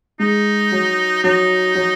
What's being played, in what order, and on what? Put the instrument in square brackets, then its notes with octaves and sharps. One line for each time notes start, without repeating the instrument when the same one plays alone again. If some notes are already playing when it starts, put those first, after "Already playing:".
[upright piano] G#3 [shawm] D#4
[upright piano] F#3
[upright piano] F#3 [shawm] D#4
[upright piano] F#3